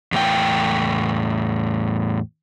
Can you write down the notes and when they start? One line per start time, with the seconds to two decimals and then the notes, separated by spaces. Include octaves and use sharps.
0.12 E2 A2 G5